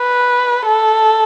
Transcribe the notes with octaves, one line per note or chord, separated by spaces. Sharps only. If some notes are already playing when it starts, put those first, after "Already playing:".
Already playing: B4
A4